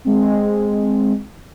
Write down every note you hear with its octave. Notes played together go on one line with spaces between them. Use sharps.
G#3 C4